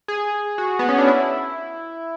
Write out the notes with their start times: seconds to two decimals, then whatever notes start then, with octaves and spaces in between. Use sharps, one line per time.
0.08 G#4
0.58 F#4
0.79 B3
0.89 C#4
0.98 D4
1.08 E4